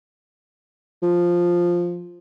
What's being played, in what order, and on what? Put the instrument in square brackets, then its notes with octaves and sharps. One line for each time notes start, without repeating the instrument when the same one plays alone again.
[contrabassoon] F3